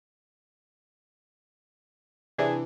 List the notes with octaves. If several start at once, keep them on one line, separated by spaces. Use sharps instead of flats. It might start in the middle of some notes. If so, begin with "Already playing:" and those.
C3 E3 D4 G#4